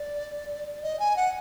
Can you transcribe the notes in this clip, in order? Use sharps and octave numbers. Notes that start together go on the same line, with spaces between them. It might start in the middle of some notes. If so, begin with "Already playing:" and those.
Already playing: D5
D#5
G#5
F#5